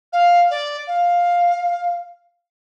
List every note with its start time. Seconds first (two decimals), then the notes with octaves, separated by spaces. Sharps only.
0.12 F5
0.50 D5
0.87 F5